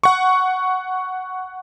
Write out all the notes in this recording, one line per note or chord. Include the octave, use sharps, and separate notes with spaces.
F#5 C#6